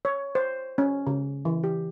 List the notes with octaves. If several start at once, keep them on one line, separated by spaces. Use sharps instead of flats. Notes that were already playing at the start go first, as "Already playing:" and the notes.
C#5
C5
C#4
C#3
E3
G4